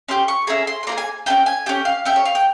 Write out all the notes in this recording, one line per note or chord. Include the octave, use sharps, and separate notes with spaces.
C#4 G4 C6
C#6
C#4 E4 G#4 A#5
C6
C6
A#3 F4 G#4 A#5
G#5
C#4 E4 G4 G5
G#5
C#4 G4 G5
F5
C#4 G4 E5
C#5
F5
G5